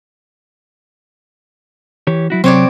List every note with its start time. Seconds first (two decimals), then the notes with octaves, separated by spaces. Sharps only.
2.07 E3 G4 C#5
2.30 F#3 E4 F#4
2.44 C3 F#3 C4 C#5 D5